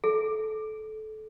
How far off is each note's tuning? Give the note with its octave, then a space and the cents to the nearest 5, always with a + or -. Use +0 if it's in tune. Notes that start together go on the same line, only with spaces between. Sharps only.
A4 -25